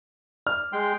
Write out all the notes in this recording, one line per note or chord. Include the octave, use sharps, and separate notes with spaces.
D5 F6
G#3 G5 C6